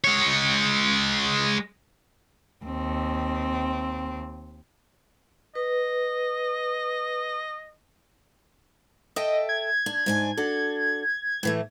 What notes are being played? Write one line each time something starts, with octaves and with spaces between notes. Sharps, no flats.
G#3 C#5
D#2 C4
B4 D#5
A4 D#5 E5 G5
G#6
D4
G#2 D4 G#5
D4 F#4 A4
A2 E3 A3